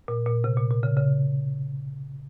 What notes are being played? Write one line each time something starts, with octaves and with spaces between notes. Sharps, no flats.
A#2
A#2
C3
A#2
A#2
C#3
C#3